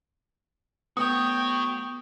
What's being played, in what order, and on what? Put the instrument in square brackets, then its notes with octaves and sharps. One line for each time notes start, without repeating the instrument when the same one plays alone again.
[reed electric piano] A3 B3 [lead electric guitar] F#4 C#5 [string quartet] G5 [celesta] D#6